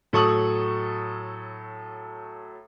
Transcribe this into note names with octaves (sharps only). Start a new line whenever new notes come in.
A2 F#3 A4 C#6 D#6 F#7